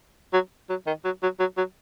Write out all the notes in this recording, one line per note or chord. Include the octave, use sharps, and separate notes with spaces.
F#3
F#3
D#3
F#3
F#3
F#3
F#3